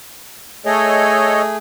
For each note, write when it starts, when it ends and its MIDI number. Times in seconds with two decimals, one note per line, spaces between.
0.66 1.57 57
0.66 1.57 68
0.66 1.42 69
0.66 1.42 73
0.66 1.42 75